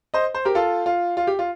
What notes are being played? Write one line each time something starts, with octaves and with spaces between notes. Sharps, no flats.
C5 D#5
C5
G4 A#4
F4 A4
F4
F4
G4
F4